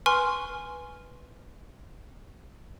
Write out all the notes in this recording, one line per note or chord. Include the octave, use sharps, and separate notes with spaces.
B4 G#5 C6 C#6 F6